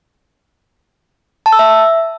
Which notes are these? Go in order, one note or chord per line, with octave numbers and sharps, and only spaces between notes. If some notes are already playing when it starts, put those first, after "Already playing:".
A5
E6
E5